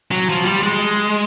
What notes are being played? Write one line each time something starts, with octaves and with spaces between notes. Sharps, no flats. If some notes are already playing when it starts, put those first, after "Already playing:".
F#3
F3
G3
G#3